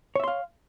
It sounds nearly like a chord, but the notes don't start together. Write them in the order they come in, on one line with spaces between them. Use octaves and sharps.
C#5 E5 C6 F5